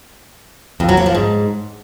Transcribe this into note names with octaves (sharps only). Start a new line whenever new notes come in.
F2
F#3
A#3
F3
G#2